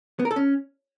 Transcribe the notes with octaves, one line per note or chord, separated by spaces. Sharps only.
B3
A#4
A4
C#4